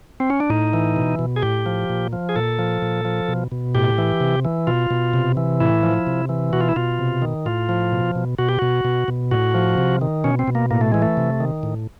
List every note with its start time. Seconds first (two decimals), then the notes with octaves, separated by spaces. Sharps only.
0.20 C4
0.30 C#4
0.40 D4
0.50 A2 D#4
0.73 E3
0.96 B2
1.19 B2
1.36 G#4
1.42 A2 G4
1.66 F3
1.90 A#2
2.13 F3
2.29 G#4
2.36 A#2 A4
2.59 F3
2.82 A#2
3.05 F3
3.28 B2
3.52 B2
3.75 A2 G4
3.98 E3
4.20 C3
4.45 E3
4.67 B2 F4
4.91 B2
5.14 C3
5.37 E3
5.60 A2 E4
5.83 F3
6.07 C3
6.29 E3
6.53 B2 F#4
6.60 F4
6.69 E4
6.76 B2 F4
6.99 C3
7.22 D#3
7.46 A2 F4
7.69 F3
7.92 B2
8.15 B2
8.39 B2 F#4
8.49 G4
8.59 B2 F#4
8.85 B2
9.08 B2
9.31 A2 F#4
9.54 F3
9.78 C3
10.01 D#3
10.24 B2 C#4
10.39 C4
10.48 B2
10.55 A#3
10.71 A2 A#3
10.81 A3
10.92 E3 G#3
11.02 A3
11.17 C3
11.40 D#3
11.63 A2